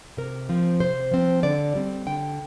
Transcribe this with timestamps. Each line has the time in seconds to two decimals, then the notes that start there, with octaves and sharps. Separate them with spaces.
0.17 C3 A#4
0.49 F3 C4
0.80 C3 C5
1.11 F3 C4
1.43 D3 D5
1.75 G3 C4
2.06 D3 G5